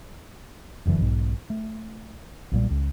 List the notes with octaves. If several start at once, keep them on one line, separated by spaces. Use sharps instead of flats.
F1 F#2 D3 E3
B1 G#2
A3
B1 A#2 G3
C#2